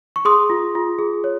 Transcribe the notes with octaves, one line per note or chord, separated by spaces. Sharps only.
C#6
G#4 C6 D#6
F4
F4
G#4
C#5